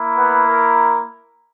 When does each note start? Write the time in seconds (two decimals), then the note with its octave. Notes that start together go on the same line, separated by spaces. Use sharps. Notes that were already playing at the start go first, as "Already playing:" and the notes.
Already playing: A#3 E4
0.17 B3 B4
0.47 A#4